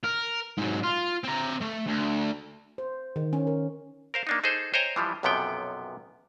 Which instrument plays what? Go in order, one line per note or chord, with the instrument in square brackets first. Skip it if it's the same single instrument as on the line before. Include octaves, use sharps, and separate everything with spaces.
[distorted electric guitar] A#4
G#2 F#3
F4
C4 A#5
A3
D2
[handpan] C5
D#3
C#4
A#4
[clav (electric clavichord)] A#4 C5 F5
A#3 D4 D#4
D#4 G#4 A4 C5
C5 C#5 D#5 G5 G#5 A#5
E3 F3 G3 E4
B1 F#2 C3 F3 B3 G5